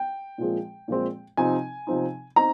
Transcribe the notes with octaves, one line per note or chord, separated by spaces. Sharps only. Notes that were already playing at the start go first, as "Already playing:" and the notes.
Already playing: G5
A#2 F3 G#3 C4
A#2 F3 G#3 C4
C3 F3 C4 D#4 G#5
C3 F3 C4 D#4
C4 D#4 A#5